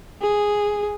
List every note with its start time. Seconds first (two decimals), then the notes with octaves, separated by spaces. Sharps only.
0.22 G#4